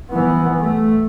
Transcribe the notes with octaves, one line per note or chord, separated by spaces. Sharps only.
E3 B3
A3